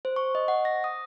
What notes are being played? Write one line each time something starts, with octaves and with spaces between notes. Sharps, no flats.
C5
C#6
D#5
F#5
A#6
D#6